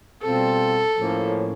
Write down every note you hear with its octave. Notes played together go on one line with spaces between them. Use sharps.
B2 G3 C4 F4 A4
A2 F3 A#3 C#4